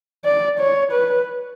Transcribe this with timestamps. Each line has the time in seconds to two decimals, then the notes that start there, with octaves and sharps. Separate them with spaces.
0.25 D5
0.59 C#5
0.92 B4